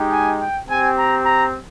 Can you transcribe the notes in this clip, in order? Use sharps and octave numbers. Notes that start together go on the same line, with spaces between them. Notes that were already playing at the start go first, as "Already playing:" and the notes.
Already playing: G#3 D#4 G4
G#5
G5
C4 G4 G#5
A#5
A#5